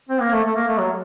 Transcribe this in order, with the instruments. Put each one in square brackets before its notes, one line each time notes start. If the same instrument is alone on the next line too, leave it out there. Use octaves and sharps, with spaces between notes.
[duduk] C4
A#3
A3
A3
A#3
A3
F#3